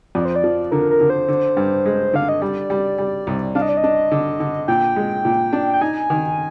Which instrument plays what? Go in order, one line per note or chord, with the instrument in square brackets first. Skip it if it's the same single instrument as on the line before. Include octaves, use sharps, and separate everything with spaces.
[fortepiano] F2 [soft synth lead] D5
[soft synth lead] C5
D5
[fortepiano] F3
[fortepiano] D3 [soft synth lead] A#4
[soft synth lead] A#4
[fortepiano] D3
[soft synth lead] C5
[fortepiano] D3
G2
G#3
[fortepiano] D3 [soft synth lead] F5
[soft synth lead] D#5
[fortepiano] G3 [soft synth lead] D5
[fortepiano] G3
G3
C2
[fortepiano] D4 [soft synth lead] F5
[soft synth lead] D#5
D5
D#5
[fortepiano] D4
D3
D3
[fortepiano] A#2 [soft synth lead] G5
[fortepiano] G#3
A#2
D4
[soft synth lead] G5
[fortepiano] D#4 [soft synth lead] G#5
[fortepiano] D#3